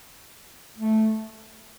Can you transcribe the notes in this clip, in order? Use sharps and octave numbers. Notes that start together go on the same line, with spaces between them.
A3